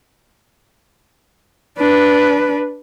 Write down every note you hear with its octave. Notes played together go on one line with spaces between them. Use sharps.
D4 B4